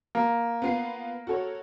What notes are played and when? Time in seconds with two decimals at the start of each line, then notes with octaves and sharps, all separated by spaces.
0.15 A#3
0.62 B3 F4 C7
1.27 F#4 A4 C#5